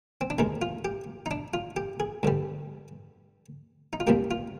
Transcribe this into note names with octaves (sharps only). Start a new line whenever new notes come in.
C4
D4
D#2 D#3 G#3 D#4
F4
G4
D#4
D4
F4
G4
G#4
G2 D3 G3
D#4
F4
C2 A#2 G3 A#3 G4
F4